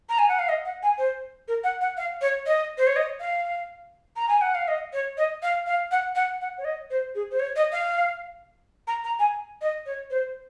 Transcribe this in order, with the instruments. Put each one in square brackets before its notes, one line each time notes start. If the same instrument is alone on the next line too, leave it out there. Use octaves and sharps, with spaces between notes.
[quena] A#5
G#5
F#5
F5
D#5
F#5
G#5
C5
A#4
F#5
F#5
F5
C#5
D#5
C5
C#5
D#5
F5
A#5
G#5
F#5
F5
D#5
C#5
D#5
F5
F5
F#5
F#5
F#5
C#5
D#5
C5
G#4
C5
C#5
D#5
F5
A#5
A#5
G#5
D#5
C#5
C5